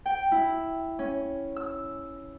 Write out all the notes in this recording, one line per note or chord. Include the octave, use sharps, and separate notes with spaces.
G5
E4
C#4
E6